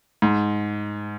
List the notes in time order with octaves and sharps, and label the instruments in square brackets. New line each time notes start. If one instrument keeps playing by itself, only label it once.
[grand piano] G#2